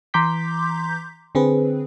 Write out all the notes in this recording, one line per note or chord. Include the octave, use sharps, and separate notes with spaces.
E3 A#5 C6 D6 G6 B6
D3 C4 G#4 B4